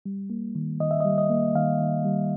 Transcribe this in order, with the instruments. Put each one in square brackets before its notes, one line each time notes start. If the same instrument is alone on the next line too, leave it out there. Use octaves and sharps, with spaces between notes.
[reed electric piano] G3
A#3
D#3
D#3 D#5
E5
G3 D#5
D#5
A#3
D#3 F5
D#3
G3